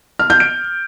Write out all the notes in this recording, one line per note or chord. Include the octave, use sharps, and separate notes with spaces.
F6
G6
D7